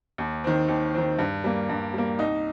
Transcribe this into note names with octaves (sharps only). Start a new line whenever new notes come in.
D#2
D#3 C4
D#2
D#3 C4
G2
G3 A#3
G2
G3 A#3
C2 D#4